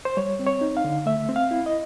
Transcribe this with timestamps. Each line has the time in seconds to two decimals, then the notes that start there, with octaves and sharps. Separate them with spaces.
0.05 C5
0.17 G3 C#5
0.39 C4
0.46 C#5
0.61 D#4
0.77 F5
0.84 D3
1.06 A3 E5
1.29 C4
1.36 F5
1.51 E4
1.66 D#5